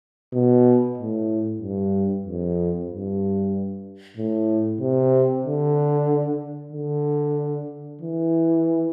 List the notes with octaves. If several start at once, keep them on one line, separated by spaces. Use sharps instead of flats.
B2
A2
G2
F2
G2
A2
C3
D3
D3
E3